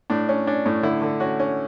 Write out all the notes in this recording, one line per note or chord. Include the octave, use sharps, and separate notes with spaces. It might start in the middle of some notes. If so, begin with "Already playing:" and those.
A2 D4
C#4
C#4 D4
A2
D3 E4
D3
C#4 F#4
C#4